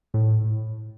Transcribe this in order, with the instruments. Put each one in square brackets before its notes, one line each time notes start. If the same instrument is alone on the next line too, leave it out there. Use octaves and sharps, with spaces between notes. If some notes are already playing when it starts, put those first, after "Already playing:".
[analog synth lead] A2